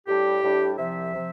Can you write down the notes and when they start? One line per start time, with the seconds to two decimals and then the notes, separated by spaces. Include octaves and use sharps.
0.07 A2 G3 D4 G4
0.43 A2 G3 D4
0.78 C2 C3 F3 E5
1.15 C3 F3